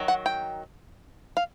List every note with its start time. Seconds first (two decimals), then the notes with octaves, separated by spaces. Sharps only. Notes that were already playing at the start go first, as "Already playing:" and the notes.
Already playing: D#3 F#3
0.08 F#5
0.26 G5
1.37 F5